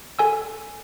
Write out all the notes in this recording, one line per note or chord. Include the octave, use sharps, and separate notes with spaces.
A4 G#5 E6